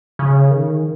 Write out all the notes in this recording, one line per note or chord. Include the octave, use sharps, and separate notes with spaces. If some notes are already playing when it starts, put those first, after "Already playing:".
C#3
D#3